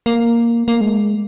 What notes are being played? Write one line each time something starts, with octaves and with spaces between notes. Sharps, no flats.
A#3
A#3
G#3